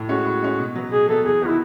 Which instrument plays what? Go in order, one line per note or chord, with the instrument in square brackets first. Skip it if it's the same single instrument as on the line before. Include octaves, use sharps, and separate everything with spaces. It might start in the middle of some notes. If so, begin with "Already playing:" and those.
Already playing: [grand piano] A2
[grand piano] G#3 C#4 [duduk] F#4
[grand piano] A2
G#3 C#4
B2
F#3 B3
[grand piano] B2 [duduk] G#4
[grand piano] F#3 B3 [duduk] A4
[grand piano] E2 [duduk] G#4
[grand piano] D#3 F#3 B3 [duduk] E4